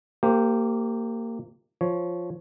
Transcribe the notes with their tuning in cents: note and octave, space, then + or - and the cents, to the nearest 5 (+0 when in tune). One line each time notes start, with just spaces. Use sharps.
A#3 -25 G4 +0 C5 +0
F3 +0 C#5 +0